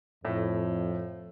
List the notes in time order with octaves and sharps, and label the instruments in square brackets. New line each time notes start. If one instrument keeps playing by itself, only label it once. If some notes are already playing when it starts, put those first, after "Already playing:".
[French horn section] F2 [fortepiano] A2